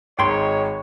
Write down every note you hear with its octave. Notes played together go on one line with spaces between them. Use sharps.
G#1 G#2 C#5 G5 C6